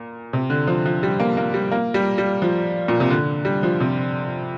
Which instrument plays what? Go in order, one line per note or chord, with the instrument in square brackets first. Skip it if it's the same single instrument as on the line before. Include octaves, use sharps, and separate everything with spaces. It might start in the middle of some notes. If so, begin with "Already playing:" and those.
Already playing: [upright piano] A#2
C3
D3
F3
F3
G3
A#3
A#3
G3
A#3
G3
G3
F3
A#2
C3
D3
G3
F3
C3